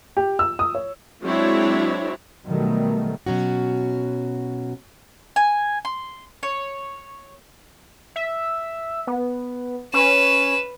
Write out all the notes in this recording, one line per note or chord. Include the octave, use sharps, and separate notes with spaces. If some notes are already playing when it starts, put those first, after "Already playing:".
G4
E6
D#6
C#5
F#3 G#3 C4 D4 E4 C#5
B2 D#3 F#3 G3 A3
B2 F#3 C#4 F#4
G#5
C6
C#5
E5
B3
C#4 B4 E7